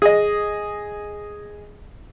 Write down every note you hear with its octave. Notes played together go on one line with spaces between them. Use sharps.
G#4 D#5